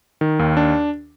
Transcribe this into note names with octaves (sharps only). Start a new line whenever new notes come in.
D#3
D#2
D4